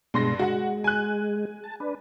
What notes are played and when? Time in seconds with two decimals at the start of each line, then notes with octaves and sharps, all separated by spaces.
0.14 G2 B2 G#3 C6 A#6
0.39 G#3 F#4 F#5
0.84 G#5 F#6
1.64 A5
1.80 D4 B4